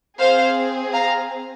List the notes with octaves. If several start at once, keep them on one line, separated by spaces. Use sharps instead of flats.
C4 G#4 C5 F5
F5 A#5